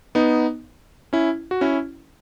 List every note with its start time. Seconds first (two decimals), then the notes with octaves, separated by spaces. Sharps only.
0.15 B3 D#4
1.13 C#4 E4
1.51 F#4
1.61 C#4 E4